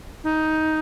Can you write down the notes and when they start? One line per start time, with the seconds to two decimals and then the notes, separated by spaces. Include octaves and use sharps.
0.24 D#4